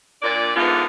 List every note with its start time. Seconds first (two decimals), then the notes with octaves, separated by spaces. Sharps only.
0.22 A#2 D4 D5
0.56 G#2 D3 E3 A#3 B3 F4